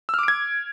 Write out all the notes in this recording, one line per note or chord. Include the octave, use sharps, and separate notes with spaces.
D6 E6 F6 G#6 D7